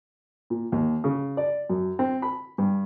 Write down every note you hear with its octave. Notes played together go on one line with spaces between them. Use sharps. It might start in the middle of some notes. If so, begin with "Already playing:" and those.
A#2
D#2
C#3
D5
F#2
C4
B5
G2